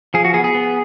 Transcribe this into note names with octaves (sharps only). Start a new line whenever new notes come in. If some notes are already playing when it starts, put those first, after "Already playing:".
F3 G#4
F#4
B3 G#4
G#4
B3